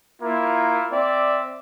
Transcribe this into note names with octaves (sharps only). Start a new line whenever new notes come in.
A#3 E4 F4 A#4
C4 D5 E5 D6